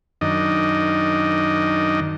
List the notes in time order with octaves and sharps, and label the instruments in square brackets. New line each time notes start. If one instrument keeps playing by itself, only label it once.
[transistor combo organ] F#2 D#3 D4 D#5